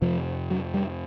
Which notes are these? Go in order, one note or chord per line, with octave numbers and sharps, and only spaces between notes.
F2 C3 F3
F#3
G3